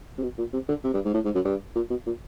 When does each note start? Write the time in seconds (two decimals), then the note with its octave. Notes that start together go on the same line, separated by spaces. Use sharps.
0.18 C3
0.23 B2
0.38 A#2
0.53 C3
0.69 D3
0.84 C3
0.94 G2
1.05 G#2
1.14 A2
1.25 G#2
1.35 F#2
1.45 G2
1.75 A#2
1.90 B2
2.06 A#2